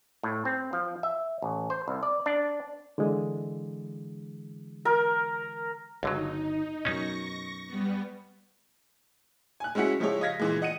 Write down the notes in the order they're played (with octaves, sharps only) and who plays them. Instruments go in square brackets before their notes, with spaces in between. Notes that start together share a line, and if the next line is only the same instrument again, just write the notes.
[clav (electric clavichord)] A2
C4
F3
E5
A1
C5
C2
D5
D4
[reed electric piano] D3 E3 G#3
[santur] A#4
[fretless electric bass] G1 [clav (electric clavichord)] C#2 D3 F#3 [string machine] D#4
[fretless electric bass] F#2 B2 [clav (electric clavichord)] C#4 D#4 [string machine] C#6 A#6
[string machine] G3 B3
[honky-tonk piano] G#5 F#6
G#3 C#4 E4 F#4 F#5 B6
F3 G#3 E4 G4 C#5
D#5 F5 G#6 A#6 B6
A#2 E3 G#3
D#5 F#5 C#7 D#7